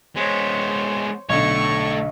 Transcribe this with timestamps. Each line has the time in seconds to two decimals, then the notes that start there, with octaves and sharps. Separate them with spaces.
0.16 G#3 B3 C5 C#5
1.29 B1 D3 A3 C#5 C#6